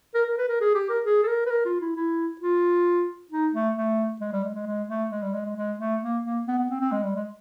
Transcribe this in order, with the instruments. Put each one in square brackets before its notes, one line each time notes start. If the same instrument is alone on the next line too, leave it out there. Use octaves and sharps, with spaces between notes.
[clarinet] A#4
A#4
B4
A#4
G#4
G4
A#4
G#4
A4
A#4
B4
A#4
F4
E4
E4
F4
D#4
A3
A3
G#3
G3
G#3
G#3
G#3
A3
G#3
G3
G#3
G#3
G#3
A3
A#3
A#3
B3
B3
C4
C4
G#3
G3
G#3